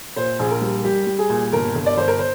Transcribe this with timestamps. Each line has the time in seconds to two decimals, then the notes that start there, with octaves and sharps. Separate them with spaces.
0.16 A#2 C5
0.39 A#1 G#4
0.51 A#4
0.62 G3
0.84 G3 G4
1.07 G3
1.19 G#4
1.30 A#2
1.52 G1 A#4
1.75 G1
1.86 D5
1.97 G1 C5
2.08 A#4
2.19 C5